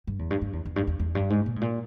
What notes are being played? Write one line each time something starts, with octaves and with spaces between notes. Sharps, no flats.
G2
E2
G2
G2
E2
E2
G2
E2
E2
G2
G#2
A#2
G#2
A#2